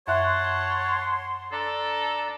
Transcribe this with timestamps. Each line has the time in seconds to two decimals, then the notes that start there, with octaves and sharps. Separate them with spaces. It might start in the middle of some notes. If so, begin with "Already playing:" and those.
0.07 F#2 C#5 E5 F#5 A5 C6 F#6
1.52 D4 A4 D5 A#5